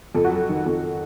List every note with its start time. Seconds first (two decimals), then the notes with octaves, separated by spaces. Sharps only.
0.15 F2 A4
0.24 F#4
0.31 F#3 A4
0.49 D#3
0.66 F2